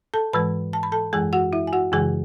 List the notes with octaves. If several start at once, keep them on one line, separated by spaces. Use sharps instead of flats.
A4 A5
G#2 E3 G#3 B4 B5
A5
B5
A4 A5
F#2 E3 G#3 G#4 G#5
F#4 F#5
E4 E5
G#5
F#4 F#5
F#2 C#3 E3 G#3 G#4 G#5